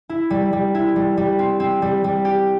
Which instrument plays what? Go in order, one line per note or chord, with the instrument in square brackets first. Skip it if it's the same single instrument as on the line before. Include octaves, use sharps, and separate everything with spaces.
[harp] E4
G3
G3
E4
G3
G3
C4
C4
G3
G3
G4